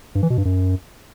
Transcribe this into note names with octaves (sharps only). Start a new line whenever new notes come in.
G2
E3
B2
G2
F#2